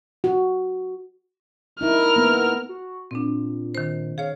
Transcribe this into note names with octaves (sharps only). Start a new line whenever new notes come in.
F#4
D#4 E4 A#4 F6
A#3 B3
F#4
A#2 C4 D4
D#3 C5
G#4 C#5 F5